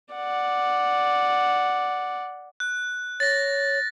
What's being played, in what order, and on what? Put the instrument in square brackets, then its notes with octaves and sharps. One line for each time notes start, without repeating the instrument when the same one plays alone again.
[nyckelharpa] D5 F#5
[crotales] F#6
[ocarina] C#5 [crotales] A6 A#6